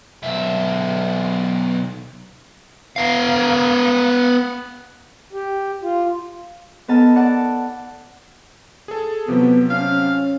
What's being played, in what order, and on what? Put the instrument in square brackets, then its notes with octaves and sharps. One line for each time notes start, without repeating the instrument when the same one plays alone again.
[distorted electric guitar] B1 E5
[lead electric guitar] B3 F5
[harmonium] G4
F4
[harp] B3 D#4 A4 A#4 D#5 A5
D5 F#5 A5
[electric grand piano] G#4 A4
[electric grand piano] C3 F3 F#3 [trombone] B3
[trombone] C#4 [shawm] F5